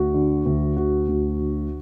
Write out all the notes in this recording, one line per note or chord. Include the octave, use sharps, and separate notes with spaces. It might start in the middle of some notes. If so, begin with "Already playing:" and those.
Already playing: D2 F#4
D3
D2
D3 F#4
D2
D3